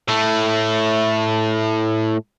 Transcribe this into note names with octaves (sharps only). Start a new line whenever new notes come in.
A2 A3